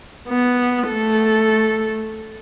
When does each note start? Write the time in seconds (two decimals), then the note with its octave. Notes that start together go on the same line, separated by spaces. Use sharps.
0.29 B3
0.89 A3 A4